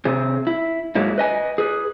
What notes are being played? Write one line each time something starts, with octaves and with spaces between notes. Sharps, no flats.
C3 C4 G#4
E4
G#2 F#3 G#3 A#3 E4
B4 D#5 G#5
G#4 B4